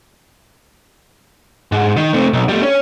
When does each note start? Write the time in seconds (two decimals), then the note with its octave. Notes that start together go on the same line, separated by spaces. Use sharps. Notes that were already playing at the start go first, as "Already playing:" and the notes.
1.72 G#2
1.97 D#3
2.14 A3 C4
2.33 B1
2.49 G3 A3
2.63 C#4